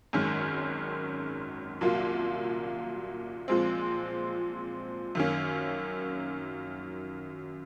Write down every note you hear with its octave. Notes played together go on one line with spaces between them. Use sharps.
G#1 F#2 D#3 G#3 C#4
C2 A#2 F#3 A#3 F4
A#2 F3 G#3 C4
F#2 D#3 A#3 C#4